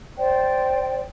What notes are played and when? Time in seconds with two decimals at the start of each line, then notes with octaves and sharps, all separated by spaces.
0.18 C5 D5 G5